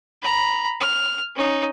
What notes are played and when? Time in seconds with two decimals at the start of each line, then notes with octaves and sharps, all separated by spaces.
0.22 A#5 B5
0.80 F6
1.36 C#4 D#4